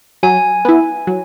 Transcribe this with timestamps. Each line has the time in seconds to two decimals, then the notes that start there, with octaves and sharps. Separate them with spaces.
0.23 F#3 G#5
0.65 B3 E4
1.07 F#3